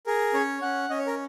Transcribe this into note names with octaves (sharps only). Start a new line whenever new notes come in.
G#4 A#4
C#4 C#5
C#4 F#5
C#4 D#5
C#5
A#4